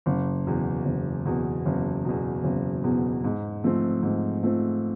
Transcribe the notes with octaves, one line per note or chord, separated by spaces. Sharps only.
F#1
E2 B2
F#1
E2 B2
F#1
E2 B2
F#1
E2 B2
G#2
F3 A3 C4
G#2
F3 A3 C4